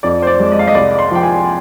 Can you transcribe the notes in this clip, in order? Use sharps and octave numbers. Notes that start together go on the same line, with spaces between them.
F2 D5
C5
D5
G#3
D#5
F5
D#5
C2 D5
C6
F3 G5
G#5